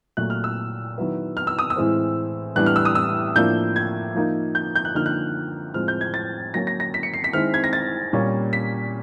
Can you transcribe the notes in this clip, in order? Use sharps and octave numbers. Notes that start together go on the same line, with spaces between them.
A#2 F#3 A3 F#6
F6
E6
D#3 F#3 B3 E4
F6
E6
D#6
E6
A2 E3 G#3 C4
A2 E3 G3 B3 D4 F#6
F6
E6
D#6
E6
A2 F3 A#3 D4 G6
G#6
F3 A#3 D#4
G6
G6
F#6
D3 F3 A#3 D#4 F6
F#6
A2 F3 G#3 C4 F6
G6
G#6
A6
F#3 A#3 C#4 A#6
A#6
A#6
B6
C#7
C7
B6
D#3 G#3 C4 E4 F6
G#6
A#6
A6
A#2 G3 A#3 C#4
B6